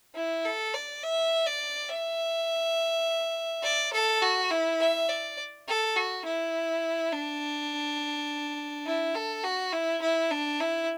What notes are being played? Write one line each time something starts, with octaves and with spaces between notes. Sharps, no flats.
E4
A4
D5
E5
D5
E5
D5
A4
F#4
E4
E5
D5
A4
F#4
E4
D4
E4
A4
F#4
E4
E4
D4
E4